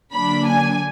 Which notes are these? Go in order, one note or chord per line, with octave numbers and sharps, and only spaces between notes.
D3 F#3 A#3 D4 B5
G#5